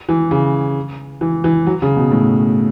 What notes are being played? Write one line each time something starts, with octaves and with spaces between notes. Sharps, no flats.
E3
C#3
E3
E3
F#3
C#3
B2
A2